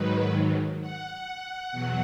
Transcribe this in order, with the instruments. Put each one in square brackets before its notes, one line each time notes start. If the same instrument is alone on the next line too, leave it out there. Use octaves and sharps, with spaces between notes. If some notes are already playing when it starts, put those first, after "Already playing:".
Already playing: [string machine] G#2 D#3 F#3 B4
F#5
E2 B2 F#3